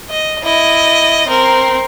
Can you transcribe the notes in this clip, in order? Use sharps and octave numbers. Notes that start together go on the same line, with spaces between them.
D#5
E4 D#5
C4 A#4